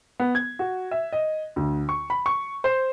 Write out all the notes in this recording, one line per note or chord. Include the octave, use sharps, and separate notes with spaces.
B3
G#6
F#4
E5
D#5
D2
C#6
B5
C#6
C5